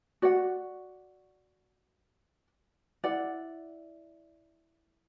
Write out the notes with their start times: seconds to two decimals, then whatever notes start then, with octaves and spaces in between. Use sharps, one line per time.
0.22 F#4 D5 F#5
3.04 E4 D5 F#5